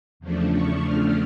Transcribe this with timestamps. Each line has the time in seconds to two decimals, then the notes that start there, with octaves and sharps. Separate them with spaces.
0.20 E2 C#3 F3 A3 D4
0.52 C#6
0.84 F6